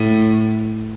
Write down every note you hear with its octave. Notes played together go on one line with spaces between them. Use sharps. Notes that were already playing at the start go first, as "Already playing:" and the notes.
Already playing: A2